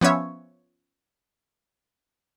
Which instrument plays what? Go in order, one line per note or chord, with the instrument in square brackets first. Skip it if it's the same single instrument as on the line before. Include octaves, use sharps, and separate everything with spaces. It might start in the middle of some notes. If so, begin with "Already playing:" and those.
[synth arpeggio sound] F3 B3 C#4 C#5 E5